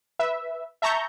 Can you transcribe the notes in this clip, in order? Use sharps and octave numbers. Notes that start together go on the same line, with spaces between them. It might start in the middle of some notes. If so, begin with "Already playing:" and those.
B4 E5
E5 A5 A#5 C#6 G6